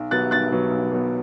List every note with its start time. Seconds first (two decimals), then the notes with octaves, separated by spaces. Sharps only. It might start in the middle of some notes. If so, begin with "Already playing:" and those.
Already playing: B1
0.11 B2 F#3 B3 F#6 A6
0.31 B1 F#6 A6
0.52 B2 F#3 B3
0.71 B1
0.92 B2 F#3 B3